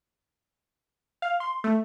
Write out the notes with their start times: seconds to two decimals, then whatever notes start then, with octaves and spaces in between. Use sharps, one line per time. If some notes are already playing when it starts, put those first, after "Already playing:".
1.22 F5
1.40 C6
1.64 A3